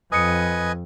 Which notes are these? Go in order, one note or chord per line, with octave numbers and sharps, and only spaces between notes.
F2 B4 D#5 G#5 D#6 C#7